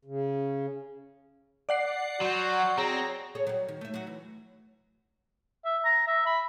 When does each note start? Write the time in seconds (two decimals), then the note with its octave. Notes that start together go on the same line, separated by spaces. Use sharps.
0.05 C#3
1.69 D5 F#5 C7
2.21 F#3 F#4 C6 G6
2.78 C4 G#4 C#5 A#5 A#6
3.35 G#4 A4 C#5
3.47 F#3 G3
3.68 D#3
3.81 A3 E5
3.94 F#3 F#4
4.07 E3
5.65 E5
5.85 A#5
6.07 E5
6.26 B5